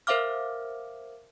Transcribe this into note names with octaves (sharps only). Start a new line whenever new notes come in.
A#4 C5 E5 F5 D6 F6